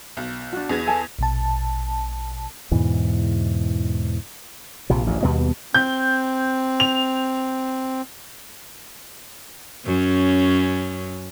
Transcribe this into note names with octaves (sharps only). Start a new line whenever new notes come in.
B1
D4 F#4
E2 G#4 G#6
A4 G#5 A5
A#1 B2 A5
E2 G#2 B2 E3
A#1 C3 F3
A1 D2 G2
D#2 B2 G3 B3
C4 G6
F7
F#2 C#4